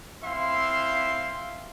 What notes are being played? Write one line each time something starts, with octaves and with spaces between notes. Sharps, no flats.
C4 E4 E5 F5 C6